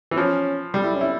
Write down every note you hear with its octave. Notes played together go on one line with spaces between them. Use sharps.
E3
F3 C#4
G3
E4
C#4
E4